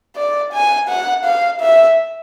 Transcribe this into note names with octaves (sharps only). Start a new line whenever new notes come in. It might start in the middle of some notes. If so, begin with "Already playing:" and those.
D5
G#5
F#5
F5
E5